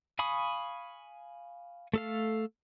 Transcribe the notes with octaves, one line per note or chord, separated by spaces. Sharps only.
F5 G#5 B5 C#6 D#6
A3 A4 F5